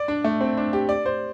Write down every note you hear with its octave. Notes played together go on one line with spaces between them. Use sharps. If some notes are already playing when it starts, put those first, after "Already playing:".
Already playing: D5
D4
A3
C4
D4
G4
D5
C5